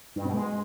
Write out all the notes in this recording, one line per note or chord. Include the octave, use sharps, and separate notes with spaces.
G2
B2
G#3